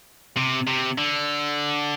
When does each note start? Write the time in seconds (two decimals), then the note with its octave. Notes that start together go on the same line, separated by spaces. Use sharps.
0.37 C3
0.68 C3
0.98 D3